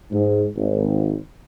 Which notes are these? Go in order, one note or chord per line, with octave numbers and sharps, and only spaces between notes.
G#2
G#1